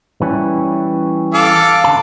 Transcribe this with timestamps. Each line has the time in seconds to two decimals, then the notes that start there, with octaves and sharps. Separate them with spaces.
0.22 E3 G3 C#4
1.34 A4 F5 D6
1.84 D3 A5